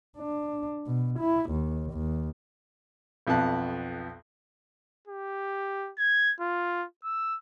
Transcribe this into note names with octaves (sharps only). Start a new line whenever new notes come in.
D4
B2
E4
D#2
D#2
B1 F2 B3 A5 F#6
G4
G#6
F4
E6